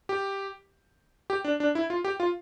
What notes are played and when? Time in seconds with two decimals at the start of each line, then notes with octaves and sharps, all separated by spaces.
0.09 G4
1.30 G4
1.44 D4
1.60 D4
1.75 E4
1.90 F4
2.04 G4
2.20 F4